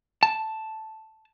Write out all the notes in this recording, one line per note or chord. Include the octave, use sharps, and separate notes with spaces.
A5